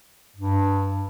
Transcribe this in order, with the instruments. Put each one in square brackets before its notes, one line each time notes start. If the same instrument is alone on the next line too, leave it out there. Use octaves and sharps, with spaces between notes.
[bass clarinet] G2